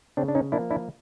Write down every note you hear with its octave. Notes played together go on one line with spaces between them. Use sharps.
C#3 C4 D4
D4
C#4 D#4
F3 A#3 D4 E4
D4 E4